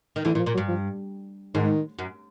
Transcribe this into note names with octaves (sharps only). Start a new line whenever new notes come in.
D#3
D2 D3 E3
A#2 E3
F3
A#2
F#3
G2
F3
G#2 D#3
F#2